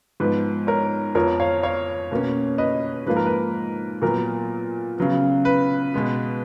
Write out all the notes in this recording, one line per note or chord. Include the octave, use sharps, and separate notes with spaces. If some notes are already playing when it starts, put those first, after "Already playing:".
G#2 F3 B3 B4
A#4 C#5
F2 F3 B3 A#4 C#5
C#5 F5
C#5 F5
B2 A#3 C#4
B4 D#5
G#2 F3 A#3 B4
A#4
B4
A#2 F#3 B3 A#4
C#3 F#3 B3
B4
B2 G#3 B3